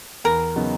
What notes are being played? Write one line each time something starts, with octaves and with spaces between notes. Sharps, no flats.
E2 A#4
C#3 F#3 B3 D#4